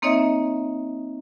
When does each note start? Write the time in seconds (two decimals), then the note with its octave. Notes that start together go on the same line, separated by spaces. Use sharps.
0.02 A#3 C4 D#4 C#5 D#5 E5